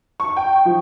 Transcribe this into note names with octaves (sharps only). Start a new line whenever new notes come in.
C#6
G5
F3